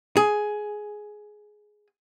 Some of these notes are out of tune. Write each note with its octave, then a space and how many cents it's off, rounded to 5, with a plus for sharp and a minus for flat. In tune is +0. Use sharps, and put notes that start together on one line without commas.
G#4 +10